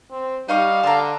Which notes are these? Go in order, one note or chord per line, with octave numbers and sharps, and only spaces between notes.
C4
G3 D#4 D#5 F5 C#6
D3 A5 A#5